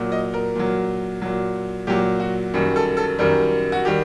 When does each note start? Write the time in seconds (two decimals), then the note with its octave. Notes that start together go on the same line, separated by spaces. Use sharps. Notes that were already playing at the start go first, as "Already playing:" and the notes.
Already playing: A#2 F#3
0.12 D#5
0.34 A#4
0.55 A#2 F#3
1.22 A#2 F#3
1.87 A#2 F#3 G4
2.20 F#4
2.54 F#2 D#3 G3
2.76 A4
2.97 A4
3.19 F#2 D#3 G3 A#4
3.72 F#4
3.85 D#3 G3 G4